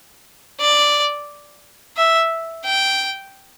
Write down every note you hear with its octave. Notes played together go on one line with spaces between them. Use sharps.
D5
E5
G5